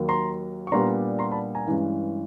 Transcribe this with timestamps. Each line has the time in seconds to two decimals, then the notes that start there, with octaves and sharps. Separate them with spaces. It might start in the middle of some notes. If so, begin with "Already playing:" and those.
Already playing: D#2 D#3 F#3 A#3
0.09 A#5 C6
0.67 C#6
0.72 A#2 G3 B3 D4 A#5 C6
1.19 A#5 C6
1.31 A5 B5
1.55 G#5 A#5
1.67 G2 E3 G#3 C#4